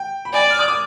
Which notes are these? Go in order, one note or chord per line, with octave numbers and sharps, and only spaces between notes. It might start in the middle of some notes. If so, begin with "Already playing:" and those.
Already playing: G5
B5
D5 G#5
F6
D#6
D6